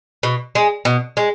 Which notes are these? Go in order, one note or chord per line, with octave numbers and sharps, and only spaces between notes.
B2
G#3
B2
G#3